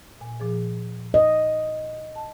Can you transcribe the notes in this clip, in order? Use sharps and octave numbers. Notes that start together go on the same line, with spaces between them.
A#2 G#5
A#2 F3 G#4
D#5
A5